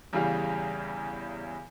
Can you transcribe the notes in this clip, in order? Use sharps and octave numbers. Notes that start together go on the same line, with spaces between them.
E2 C#3 E3 G3 F5